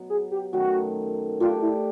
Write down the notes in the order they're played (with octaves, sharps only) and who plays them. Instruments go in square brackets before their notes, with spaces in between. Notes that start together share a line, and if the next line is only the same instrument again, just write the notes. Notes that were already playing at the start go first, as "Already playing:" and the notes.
Already playing: [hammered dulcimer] B2 F#3 B3
[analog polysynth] G#4
G4
[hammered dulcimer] F#2 D#3 F#3 A3 [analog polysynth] F#4
[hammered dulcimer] A3 D4 G4 A#4 [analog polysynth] F4
[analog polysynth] E4